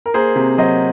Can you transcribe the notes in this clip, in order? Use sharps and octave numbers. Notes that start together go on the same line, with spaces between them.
A#4
A#3 G#4 C5
C3
F#3 C5 D#5